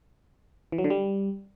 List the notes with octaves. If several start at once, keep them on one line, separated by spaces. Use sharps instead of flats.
E3
F#3
D3
G3